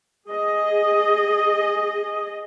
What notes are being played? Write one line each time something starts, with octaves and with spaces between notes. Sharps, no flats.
G#4 D#5